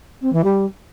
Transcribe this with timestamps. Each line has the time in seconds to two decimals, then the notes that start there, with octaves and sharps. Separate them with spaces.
0.21 C4
0.32 E3
0.44 G3